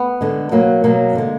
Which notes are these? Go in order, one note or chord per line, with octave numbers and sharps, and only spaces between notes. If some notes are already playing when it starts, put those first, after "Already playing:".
Already playing: B3
D3 G#3
B2 F#3 A#3
B2 F#3 A#3
D3 G#3